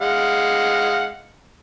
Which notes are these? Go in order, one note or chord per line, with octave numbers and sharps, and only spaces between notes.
G#3 F5 F#5